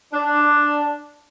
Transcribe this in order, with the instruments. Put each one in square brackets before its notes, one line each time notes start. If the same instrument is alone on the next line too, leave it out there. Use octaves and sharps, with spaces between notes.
[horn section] D4